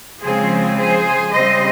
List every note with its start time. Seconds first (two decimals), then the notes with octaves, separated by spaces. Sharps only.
0.22 C#3 F3 G#3 C4 G#4 C5
0.77 G#4 C5
1.33 C#3 G3 C4 C5 D#5